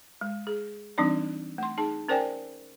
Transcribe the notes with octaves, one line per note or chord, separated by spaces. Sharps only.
G#3
G#4
E3 G3 C4 D4 D#4 D5
A3 C6
D#4 G#4 A5
C#4 A#4 C5 D5 G5 G#5